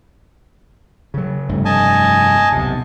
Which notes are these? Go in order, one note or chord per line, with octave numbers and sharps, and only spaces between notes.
C#3 F#3
F1 G2 A3
D#5 G#5 A5
B1 C3